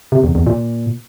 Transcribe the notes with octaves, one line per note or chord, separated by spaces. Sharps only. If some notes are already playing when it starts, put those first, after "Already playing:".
C3
E2
E2
A#2